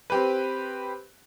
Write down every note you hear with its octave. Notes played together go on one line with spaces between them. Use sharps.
C4 G4 B4